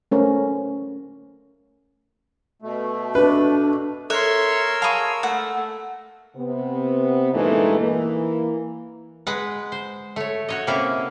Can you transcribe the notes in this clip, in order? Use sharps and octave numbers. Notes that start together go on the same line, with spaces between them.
A3 C#4 A#4 C5
B2 A3
D4 B4
A4 A#4 C#5 E5 C6 E6 F#6
G#4 F5 A5 B5 C#6
A3 F#5
C3 B3
G2 A#2 E3 G#3 A3 D#4
E3 A#3
G#3 B4 F#5
C5
A3 C#5
F#4 C#5 D#5
C3 A#3 C#4 E4 A4